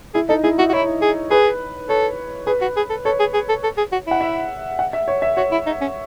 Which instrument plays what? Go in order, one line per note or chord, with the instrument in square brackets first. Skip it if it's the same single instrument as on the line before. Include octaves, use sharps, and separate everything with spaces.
[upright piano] E4 [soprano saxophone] G#4
[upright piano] D#4 [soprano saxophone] A4
[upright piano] E4 [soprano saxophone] G#4
[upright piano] E4 [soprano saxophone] F#4
[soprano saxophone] F#4
[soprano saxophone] E4 [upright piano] C#5
[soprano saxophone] G#4
[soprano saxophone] G#4 [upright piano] B4
[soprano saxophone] A4 [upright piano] C#5
[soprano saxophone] G#4 [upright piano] B4
[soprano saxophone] F#4
G#4
A4
[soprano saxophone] A4 [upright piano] C#5
[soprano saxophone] G#4
G#4
A4
A4
G#4
F#4
[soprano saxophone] E4 [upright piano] F#5
[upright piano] E5
F#5
E5
C#5
E5
[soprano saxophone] F#4 [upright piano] C#5
[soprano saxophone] E4
D#4
C#4